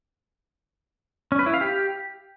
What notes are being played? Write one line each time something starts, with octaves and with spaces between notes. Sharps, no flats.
C#4
B4
E4
F5
G4